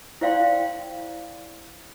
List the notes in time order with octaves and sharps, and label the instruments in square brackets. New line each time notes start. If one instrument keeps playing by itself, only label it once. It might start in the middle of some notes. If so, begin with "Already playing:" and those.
[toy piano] E4 C5 D5 F5 G5 C6